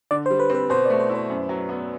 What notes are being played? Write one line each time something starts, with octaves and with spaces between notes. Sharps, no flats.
D3 D5
C5
G3
B4
C4 B4
B2 C5
D5
A3
C5
E4
C5
F#2
F#3
B3